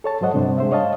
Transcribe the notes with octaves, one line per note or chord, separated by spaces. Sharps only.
A4 C#5 A5
G#2 F#3 C5 D#5 F#5
G2 C3 G3 D4 C5
G#3 C5 E5
C#5 D#5 F5 A5